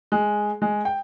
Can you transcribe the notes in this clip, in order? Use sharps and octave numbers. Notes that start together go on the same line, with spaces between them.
G#3
G#3
G5